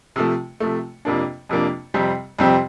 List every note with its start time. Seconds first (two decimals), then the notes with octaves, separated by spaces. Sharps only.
0.16 C3 F3 A3
0.60 C3 F3 A3
1.05 F2 C3 F3 A#3 D4
1.49 F2 C3 F3 A#3 D4
1.94 F2 C3 G3 C4 G4
2.39 F2 C3 G3 C4 G4